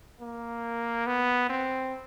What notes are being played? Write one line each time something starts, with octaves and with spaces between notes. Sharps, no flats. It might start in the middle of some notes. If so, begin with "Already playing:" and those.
A#3
B3
C4